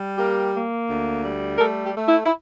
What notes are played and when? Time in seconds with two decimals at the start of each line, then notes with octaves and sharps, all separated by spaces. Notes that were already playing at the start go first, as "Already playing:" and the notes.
Already playing: G3
0.18 A#3 G4
0.53 A#3
0.90 D2
1.24 G3
1.57 A#4
1.60 A3 A4
1.84 G4
1.96 A3
2.08 E4
2.25 E4